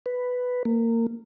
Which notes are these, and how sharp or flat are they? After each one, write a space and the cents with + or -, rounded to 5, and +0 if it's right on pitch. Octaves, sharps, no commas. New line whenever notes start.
B4 +5
A#3 -25